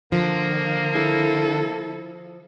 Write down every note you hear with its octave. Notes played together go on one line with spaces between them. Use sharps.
D3 F3 A#3
E4 A4